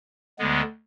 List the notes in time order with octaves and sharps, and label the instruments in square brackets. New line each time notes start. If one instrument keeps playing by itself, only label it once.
[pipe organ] D2 D3 G#3 B3